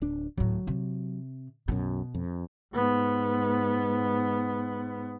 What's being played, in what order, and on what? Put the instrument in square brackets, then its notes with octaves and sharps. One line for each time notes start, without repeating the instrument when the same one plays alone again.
[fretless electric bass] D1 D4
[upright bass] D1 A2 [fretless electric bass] F#3
[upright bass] C3
[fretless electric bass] B1 F#2 [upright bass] B2
[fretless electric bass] F2
[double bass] G#2 B3